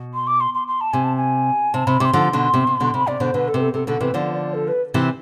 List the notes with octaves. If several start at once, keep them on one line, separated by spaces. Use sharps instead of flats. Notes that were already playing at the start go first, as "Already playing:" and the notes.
Already playing: B2
C6
D6
C6
C6
C6
A5
C3 G#5
A5
G#5
C3 A5
C3 B5
C3 D6
C6
D3 F3
B2 D3
C3
C3
B2 D3
C3 B5
C3 D5
B2 D3 C5
B2 D3 B4
A4
C3 B4
A4
C3 A4
B2 D3 A4
C3 E3 B4
D3 F3 D5
D5
A4
B4
C3 E3